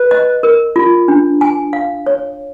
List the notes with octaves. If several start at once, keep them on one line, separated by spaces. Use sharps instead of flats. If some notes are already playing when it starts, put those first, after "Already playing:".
Already playing: B4
D#5
A#4
F4
D4
G#5
F5
C#5